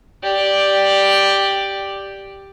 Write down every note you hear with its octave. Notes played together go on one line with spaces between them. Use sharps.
G4 D5